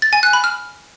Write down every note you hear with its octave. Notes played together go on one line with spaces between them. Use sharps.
A6
G#5
F#6
B5
F6